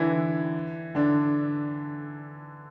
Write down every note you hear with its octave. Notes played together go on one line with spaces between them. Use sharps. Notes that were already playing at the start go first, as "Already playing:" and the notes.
Already playing: D3 E3 D4 E4
D3 D4